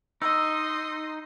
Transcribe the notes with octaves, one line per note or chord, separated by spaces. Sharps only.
D#4 D#5 C6 E6